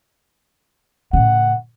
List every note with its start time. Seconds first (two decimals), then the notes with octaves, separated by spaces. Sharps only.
1.13 A2 C#3 F#5